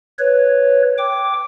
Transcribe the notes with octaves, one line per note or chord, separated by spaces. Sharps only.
B4 C#5
G5 D6